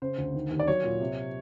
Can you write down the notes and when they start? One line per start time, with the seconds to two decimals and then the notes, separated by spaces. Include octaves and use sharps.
0.02 C#3 C5
0.18 D2
0.35 D#3
0.51 D#2
0.60 D5
0.67 F#3 C#5
0.84 A#2
1.00 C3